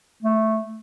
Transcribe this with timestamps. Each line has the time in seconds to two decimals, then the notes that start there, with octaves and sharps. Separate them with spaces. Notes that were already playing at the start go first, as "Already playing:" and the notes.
0.23 A3